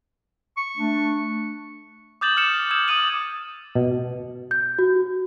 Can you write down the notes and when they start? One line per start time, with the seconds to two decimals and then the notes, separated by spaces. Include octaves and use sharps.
0.57 C#6
0.77 A3 D4
2.21 D6 D#6 G6 A6 E7 F#7
2.37 F6 G6 C#7 E7
2.71 D#6 E6 G6 G#6 E7
2.88 D6 D#6 F6 D#7 F#7
3.75 B2
4.51 G6
4.79 F#4